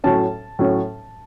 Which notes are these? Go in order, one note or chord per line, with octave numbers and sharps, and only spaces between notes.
A2 F#3 C#4 A5
A2 F#3 C#4